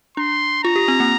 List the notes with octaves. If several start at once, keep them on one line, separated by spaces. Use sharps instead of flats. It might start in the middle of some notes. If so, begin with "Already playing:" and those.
D4 C6
F4 A#5
G4
C4
A#3